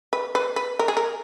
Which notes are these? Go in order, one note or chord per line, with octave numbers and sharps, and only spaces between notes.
B4
B4
B4
A#4
G#4
A#4